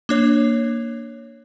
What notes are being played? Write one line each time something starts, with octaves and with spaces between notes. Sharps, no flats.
A#3 D4 C#5